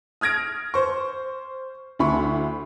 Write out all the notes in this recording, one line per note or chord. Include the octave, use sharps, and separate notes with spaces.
D#6 F6 G#6 A#6 D7
C5 C#6
D2 E4 B5 C#6